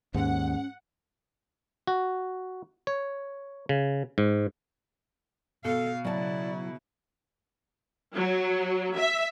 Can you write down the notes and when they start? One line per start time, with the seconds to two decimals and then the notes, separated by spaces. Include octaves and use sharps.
0.14 D#2 G#2 C#4 F#5
1.87 F#4
2.87 C#5
3.69 C#3
4.18 G#2
5.65 B2 A4 F5
6.05 C#3 F#3 E4 D5 A5
8.15 F#3
8.96 E5